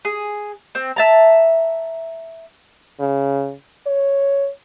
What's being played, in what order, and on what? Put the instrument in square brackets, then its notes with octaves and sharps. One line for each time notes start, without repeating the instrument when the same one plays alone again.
[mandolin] G#4
C4
E5 A5 A#5
[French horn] C#3
C#5